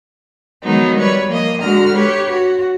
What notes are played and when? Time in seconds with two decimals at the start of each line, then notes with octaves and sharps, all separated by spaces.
0.63 D#3 F3 F#3 G#3 B3 D#4
0.98 G3 B4 C#5
1.29 F3 A#3 D#5
1.62 D3 G#3 F#4 A#5 F6
1.93 G4 B4 C#5
2.32 F#4